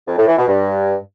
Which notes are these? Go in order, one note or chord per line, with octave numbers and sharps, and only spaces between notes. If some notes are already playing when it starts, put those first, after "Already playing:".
F2
A2
E3
B2
G2